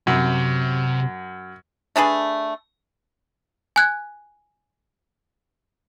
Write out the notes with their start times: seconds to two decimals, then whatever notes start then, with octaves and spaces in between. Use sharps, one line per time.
0.07 F#2 C3
1.96 A3 D4 G#4 B4
3.76 G#5 F#6 G#6